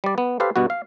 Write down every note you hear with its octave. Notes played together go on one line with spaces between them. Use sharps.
G3 D5
B3
G4 A4 B4 C5 F5
G2 B2 B3 F#4
F5